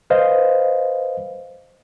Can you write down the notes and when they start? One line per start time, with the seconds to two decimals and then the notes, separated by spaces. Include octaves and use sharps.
0.10 B4 C5 D#5 F5